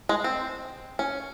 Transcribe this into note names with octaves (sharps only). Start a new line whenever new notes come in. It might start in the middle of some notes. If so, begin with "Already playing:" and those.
G#3
C4
C#4